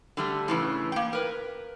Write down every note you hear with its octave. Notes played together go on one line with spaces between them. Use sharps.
D3 G3 A3
A2 C#3 E3
A#3 G5
A#4 B4